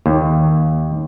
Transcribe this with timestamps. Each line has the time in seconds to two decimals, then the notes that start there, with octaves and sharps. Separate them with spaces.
0.06 D#2